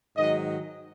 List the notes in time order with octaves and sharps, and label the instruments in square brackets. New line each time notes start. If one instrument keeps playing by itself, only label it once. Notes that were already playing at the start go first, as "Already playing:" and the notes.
[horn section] G#2 D#3 F#3 D#5